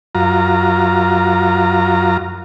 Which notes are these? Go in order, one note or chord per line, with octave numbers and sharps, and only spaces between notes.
F#2 F4 A#5